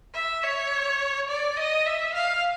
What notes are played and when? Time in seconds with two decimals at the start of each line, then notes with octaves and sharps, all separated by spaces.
0.15 E5
0.43 C#5
1.29 D5
1.57 D#5
1.86 E5
2.14 F5